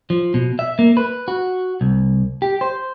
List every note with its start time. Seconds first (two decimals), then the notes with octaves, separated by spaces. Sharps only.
0.10 F3
0.34 B2
0.59 E5
0.79 A#3
0.97 B4
1.28 F#4
1.81 C2
2.42 G4
2.61 C5